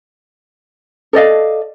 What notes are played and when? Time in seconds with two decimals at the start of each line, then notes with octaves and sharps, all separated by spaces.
1.13 A4 D5 D#5 F5